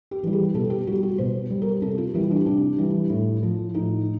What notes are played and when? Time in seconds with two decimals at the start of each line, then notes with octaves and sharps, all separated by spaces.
0.11 G4
0.23 E3 G3
0.33 G#4
0.54 B2 A4
0.70 G4
0.87 G3 F#4
1.03 F#4
1.18 B2 C5
1.50 G3
1.62 A#4
1.82 C3 A4
1.98 F4
2.14 E3 G3 E4
2.31 D4
2.46 C3 D4
2.78 E3 G3
3.10 A2
3.43 F3
3.74 A2 D#4